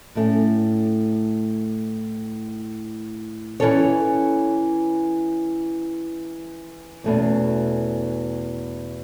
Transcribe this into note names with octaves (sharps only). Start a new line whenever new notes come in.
A2 A3 C#4
E3 C#4 A4 C#5
E2 B2 A3 C#4